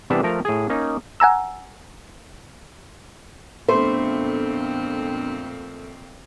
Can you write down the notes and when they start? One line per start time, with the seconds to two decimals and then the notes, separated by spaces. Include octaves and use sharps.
0.10 C3 E3 G3 B3 D4 E5
0.23 F3 A3 A#4 A#5
0.45 A2 G#4
0.69 A#3 C#4 D#4
1.20 F#5 G#5 A#5 E6
3.68 F2 A#2 A3 B3 C4 D4 C5